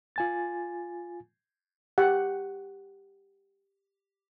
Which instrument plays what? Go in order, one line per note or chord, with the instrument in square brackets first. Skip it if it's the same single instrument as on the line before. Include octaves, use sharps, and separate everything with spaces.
[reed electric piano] F4 G#5 A6
[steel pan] G4 F#5